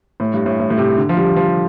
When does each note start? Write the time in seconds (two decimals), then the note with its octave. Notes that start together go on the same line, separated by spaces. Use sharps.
0.20 A2
0.33 G2
0.46 A2
0.59 A2
0.70 A2
0.77 C3
0.98 D3
1.09 F3
1.17 G3
1.36 F3